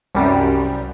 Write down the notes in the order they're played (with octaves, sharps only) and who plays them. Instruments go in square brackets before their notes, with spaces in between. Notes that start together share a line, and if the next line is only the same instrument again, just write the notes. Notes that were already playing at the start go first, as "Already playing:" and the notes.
[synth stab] C2 F#2 G3